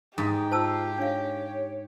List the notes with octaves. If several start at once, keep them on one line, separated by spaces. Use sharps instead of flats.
G#2 G4
F4 C5 A5 E6
D4 C#5 F5